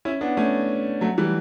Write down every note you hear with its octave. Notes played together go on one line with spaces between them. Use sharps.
C#4 E4
B3 D4
A3 C#4
F#3 A3
E3 G3